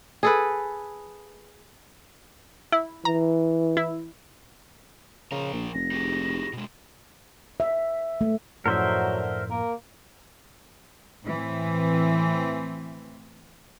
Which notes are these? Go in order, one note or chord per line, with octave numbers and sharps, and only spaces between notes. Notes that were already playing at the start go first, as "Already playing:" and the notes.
G#4 A4 B4
E4
E3 A#5
E4
C#3 F3 A#4
A#1
F1 A#6
D#4 G4 G#4
B2 G#3
E5
A3
F#2 A2 D3 F3 F#3 A#4 C5 E5
A#3 A#4
A2 E3 C4